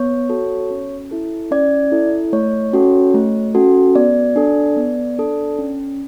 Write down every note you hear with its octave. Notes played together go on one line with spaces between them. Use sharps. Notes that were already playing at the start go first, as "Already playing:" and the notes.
Already playing: B3 C#5
F#4 A4
C#4
E4 A4
C#4 D5
E4 A4
A3 C#5
C#4 F#4 A4
A3
C#4 F#4 A4
B3 D5
D4 A4
B3
D4 A4
C#4